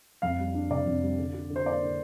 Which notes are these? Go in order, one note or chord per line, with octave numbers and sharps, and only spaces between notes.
F2 F5
G3
D4
C3 D5
F2
G3
D3
F4
D3
C5
A#3 D5
D3